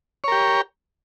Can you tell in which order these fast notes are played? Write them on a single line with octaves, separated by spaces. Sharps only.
C#5 A#4 G4